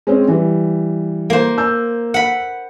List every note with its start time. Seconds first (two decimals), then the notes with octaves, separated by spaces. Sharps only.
0.07 G#3 C4 C#4
0.28 E3 G3
1.30 A#3 C5
1.58 E6 G6
2.14 F#5 B5